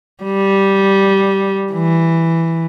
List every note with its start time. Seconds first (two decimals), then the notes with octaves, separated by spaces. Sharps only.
0.23 G3
1.72 E3